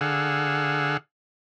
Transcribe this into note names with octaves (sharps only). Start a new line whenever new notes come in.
D3 G#4 F5 F#5 E6